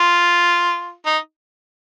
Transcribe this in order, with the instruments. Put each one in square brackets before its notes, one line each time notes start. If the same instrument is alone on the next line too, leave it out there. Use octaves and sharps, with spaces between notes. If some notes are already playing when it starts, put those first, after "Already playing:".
Already playing: [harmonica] F4
D#4